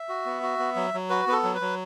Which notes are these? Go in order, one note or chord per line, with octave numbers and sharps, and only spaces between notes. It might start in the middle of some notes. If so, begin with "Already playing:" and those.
Already playing: E5
F#4
B3
F#4
B3
F#3
F#3
F#4 B4
B3 B4
A4
F#3
B4
F#3